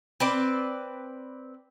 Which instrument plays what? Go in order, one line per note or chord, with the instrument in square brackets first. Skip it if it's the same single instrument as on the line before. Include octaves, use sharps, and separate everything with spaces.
[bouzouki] C4 B4 D5